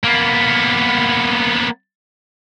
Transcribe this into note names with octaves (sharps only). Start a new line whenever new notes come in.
A#3 B3